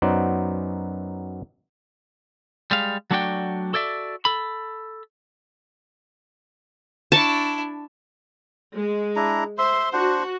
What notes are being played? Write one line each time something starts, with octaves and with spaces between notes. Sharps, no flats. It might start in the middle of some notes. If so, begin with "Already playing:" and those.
F#2 F#3 B3 D#4 C5 D5
G3 G#3 F5
F#3 A3 D4 F#4 D5 G5
F#4 A4 C#5 D5 E5
A4 B5
D4 E4 A5 C#6
G#3
D4 E4 A#5
C5 E5 C6
D4 F#4 C5 F#5